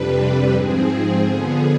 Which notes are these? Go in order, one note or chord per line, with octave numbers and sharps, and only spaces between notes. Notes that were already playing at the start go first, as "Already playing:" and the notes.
Already playing: F2 C3 G3 D4 B4
G#2 F3 C4 G#4
D3 F3 B3